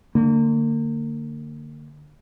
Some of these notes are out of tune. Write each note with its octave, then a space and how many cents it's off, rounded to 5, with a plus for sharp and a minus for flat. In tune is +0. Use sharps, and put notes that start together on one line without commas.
D3 +20 A#3 -30